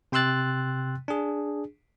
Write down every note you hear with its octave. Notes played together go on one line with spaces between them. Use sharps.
C3 G5 C6 E6 F#6 A6
D4 G#4